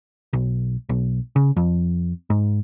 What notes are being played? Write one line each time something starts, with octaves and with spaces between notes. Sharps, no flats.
B1
B1
C#3
F2
G#2